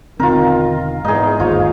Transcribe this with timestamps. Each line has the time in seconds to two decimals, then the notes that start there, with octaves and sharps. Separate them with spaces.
0.20 E1 D3 D#3 C4 F4 A#4
1.05 E2 G#2 D#4 G#4
1.40 G1 D#2 G#2 F4 C#5